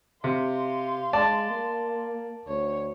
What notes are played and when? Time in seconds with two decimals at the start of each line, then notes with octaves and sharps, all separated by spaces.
0.24 C3 F5 C6
1.13 G#3 D5 A5
1.51 A#3
2.47 D2 C#5